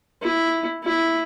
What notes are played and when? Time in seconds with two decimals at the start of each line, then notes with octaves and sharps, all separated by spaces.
0.22 E4
0.83 E4